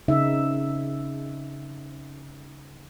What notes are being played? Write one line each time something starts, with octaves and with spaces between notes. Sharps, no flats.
C#3 C4 D#4 E5